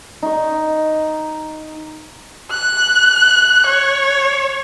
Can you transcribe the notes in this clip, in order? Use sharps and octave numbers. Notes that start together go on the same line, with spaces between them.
D#4 C#6
F#6
C#5